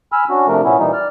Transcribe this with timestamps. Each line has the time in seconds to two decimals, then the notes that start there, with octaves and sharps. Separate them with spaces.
0.12 G#5 B5 E6 F6
0.29 C#4 D4 F#4
0.47 C3 F3 A3 D4 A#4
0.64 A#2 B3 C#4 E4
0.79 A#2 E3 G3 D#4
0.93 D5 F6